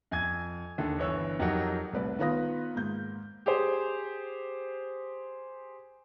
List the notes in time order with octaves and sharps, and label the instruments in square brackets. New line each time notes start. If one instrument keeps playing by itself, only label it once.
[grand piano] F2 G#5 G#6
D#2 D3 A4
G1 E3 C#5 E6
F2 F#3 D#4 G4 A#4 F#5
[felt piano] C2 A3 B4 D5
D#3 B3 F4 B4 D#6 A#6
G#2 A#3 G6
[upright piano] G4 G#4 C5